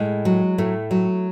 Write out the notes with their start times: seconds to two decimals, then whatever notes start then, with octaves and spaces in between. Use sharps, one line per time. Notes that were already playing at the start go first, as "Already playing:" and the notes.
Already playing: A2 G#3
0.25 F#3
0.58 A2 A3
0.91 F#3